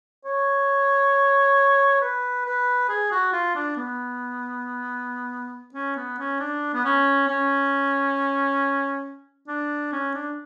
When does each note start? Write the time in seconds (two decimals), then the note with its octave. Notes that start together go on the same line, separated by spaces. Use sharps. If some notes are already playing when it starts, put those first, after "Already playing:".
0.25 C#5
2.01 B4
2.45 B4
2.89 G#4
3.11 F#4
3.33 F4
3.55 D4
3.76 B3
5.74 C#4
5.96 B3
6.18 C#4
6.40 D4
6.74 B3
6.85 C#4
7.28 C#4
9.47 D4
9.93 C#4
10.14 D4